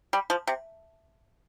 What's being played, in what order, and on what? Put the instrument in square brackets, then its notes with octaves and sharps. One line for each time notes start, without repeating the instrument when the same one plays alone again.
[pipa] G3
F3
C3